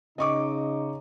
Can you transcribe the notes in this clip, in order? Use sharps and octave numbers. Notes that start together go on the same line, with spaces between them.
C#3 D#4 D#5 C#6 D6